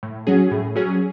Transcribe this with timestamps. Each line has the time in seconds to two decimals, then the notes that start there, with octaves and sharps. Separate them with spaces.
0.03 A2
0.27 F#3 C#4 G#4
0.51 A2
0.75 F#3 C#4 G#4